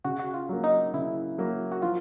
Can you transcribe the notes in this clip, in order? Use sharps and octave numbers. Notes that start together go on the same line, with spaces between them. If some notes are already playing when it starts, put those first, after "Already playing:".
C#3 F#4
F#4
F4
F#3 A#3
D#4
C#3 E4
F#3 A#3
F#4
F3 F4